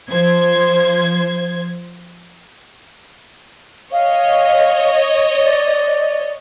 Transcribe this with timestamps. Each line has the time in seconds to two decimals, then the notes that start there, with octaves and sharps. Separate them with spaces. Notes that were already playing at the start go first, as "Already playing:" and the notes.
0.11 F3 C5 G#6
3.93 C#5 D#5 F5
5.44 D5